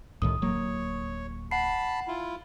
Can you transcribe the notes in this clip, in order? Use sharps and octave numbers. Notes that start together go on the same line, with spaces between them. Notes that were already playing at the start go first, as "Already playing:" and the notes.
C2 A2 D#3 D#6
D1 F#3 A#3 C#5
F#5 A5 B5 C7
E4 F4